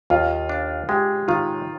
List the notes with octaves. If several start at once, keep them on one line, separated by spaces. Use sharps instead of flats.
D#2 F4
D4
G#3 G4
D#3 F4